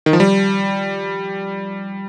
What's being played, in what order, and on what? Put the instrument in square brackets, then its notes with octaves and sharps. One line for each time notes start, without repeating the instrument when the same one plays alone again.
[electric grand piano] D#3
F3
G3